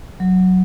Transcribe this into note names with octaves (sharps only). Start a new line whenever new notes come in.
F#3